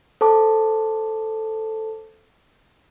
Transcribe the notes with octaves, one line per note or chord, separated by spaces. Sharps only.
A4 C5 A5 D6